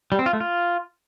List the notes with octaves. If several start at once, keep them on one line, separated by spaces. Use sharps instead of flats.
G3
C4
F4
A3
F4